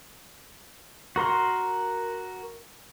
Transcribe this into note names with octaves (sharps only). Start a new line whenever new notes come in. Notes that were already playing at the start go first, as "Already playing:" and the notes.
F#4 A#4 C6